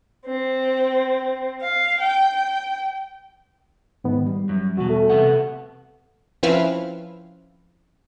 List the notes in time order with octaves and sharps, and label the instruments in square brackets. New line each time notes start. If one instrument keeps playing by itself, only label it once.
[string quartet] C4
F5
G5
[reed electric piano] G#2 D#3 B3
G3
[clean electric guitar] F#2
[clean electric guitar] E2 B2 [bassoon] F#4
[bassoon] A3
[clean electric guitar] C3 B3 F#5
[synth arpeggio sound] F3 C4 C#4 E4 B4 F5